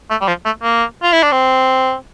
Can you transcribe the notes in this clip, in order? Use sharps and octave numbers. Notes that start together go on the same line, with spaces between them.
A3
G3
F3
A3
A#3
F4
E4
D4
C4